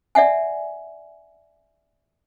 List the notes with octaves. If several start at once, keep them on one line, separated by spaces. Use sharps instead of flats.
D5 E5 F#5 G#5